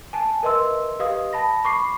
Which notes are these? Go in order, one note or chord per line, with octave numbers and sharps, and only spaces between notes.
G#5 A5
A#4 B4 D#5 E5 C6 E6
G4 B4 D#5 F5 D#6
A5 B5 A#6
B5 C#6 D6 C7